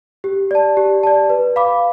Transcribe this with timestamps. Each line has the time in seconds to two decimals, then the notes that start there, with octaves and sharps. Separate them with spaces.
0.24 G4
0.51 D5 A5
0.77 G4
1.03 D5 A5
1.30 B4
1.56 F5 B5 D6